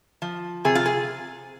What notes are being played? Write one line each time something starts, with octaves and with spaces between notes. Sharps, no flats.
F3
C3 G#4
F4
G#4